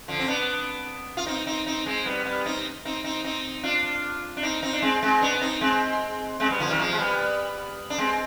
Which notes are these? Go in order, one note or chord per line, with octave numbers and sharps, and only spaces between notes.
D3 F3
C4
B3 D4
F4
C4 D#4
C4 D#4
C4 D#4
G#3 C4
G3 B3
G3 B3
C4 D#4
C4 D#4
C4 D#4
C4 D#4
D4 F4
D4
C4 D#4
C4 D#4
D4
G#3 C4
G#3 C4
B3 D4
C4 D#4
G#3 C4
G#3 C4
G3 B3
D3 F3
D#3 G3
F3 G#3
G#3
G3 B3
D4
G#3 C4